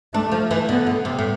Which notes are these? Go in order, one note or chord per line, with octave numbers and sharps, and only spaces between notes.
A3 D4
F3
E3
D3 B3
D3
C3
A2